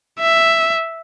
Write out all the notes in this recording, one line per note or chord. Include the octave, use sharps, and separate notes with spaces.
E5